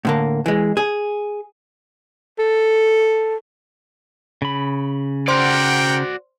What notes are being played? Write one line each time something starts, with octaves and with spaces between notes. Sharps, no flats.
A2 D3 A#3
E3 G#3
G#4
A4
C#3 B5
F#4 A#4 C5 D5 F#5 G5 C6